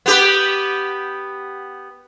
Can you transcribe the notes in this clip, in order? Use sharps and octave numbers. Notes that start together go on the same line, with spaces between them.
B3 G4 B4